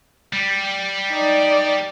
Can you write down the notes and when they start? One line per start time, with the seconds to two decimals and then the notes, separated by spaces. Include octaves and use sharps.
0.33 G3
1.11 D#4 D5